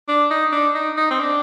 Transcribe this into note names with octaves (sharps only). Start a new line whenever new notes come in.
D4
D#4
D4
D#4
D#4
C4
D4